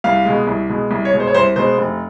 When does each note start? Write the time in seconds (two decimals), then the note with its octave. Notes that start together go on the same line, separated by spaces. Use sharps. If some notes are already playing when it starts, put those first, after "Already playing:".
0.04 C2 F5
0.25 B2 G#3
0.47 C2
0.69 B2 G#3
0.91 C2
1.05 C#5
1.13 B2 G#3
1.20 C5
1.27 C#5
1.34 C2 C5
1.56 B2 G#3 C5
1.78 F1